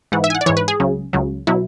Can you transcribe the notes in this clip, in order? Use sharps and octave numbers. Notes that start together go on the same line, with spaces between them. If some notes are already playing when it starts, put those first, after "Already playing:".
G#2 E3 F#5
E5
G#5
F#5
D5
G#2 E3 C#5
B4
G#4
C#2 C#3 F#3
C#2 C#3 F#3
B2 F#3 E4